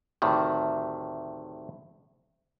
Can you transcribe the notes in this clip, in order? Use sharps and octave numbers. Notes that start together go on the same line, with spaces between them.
D2 A2 C3 D#3